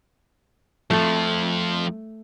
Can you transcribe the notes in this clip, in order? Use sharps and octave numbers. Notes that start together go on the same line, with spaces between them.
F2 F3 A3 A4